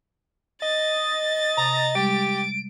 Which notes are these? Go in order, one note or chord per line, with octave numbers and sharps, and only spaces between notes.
D#5 A6
C3 A#5
G3 G#3 G4 D7